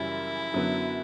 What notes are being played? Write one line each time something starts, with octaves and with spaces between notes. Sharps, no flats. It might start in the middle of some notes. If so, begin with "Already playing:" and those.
Already playing: F#2 C#3 E3 G3 E4
F#2 D3 F#3 B3